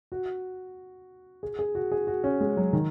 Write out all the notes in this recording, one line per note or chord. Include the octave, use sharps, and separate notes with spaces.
F#4
G#4
G#4
F#4
G#4
F#4
C#4
G#3
F#3
D#3